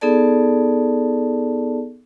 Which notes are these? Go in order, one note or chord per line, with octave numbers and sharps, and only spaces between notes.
B3 D#4 G#4 A4 D5 A5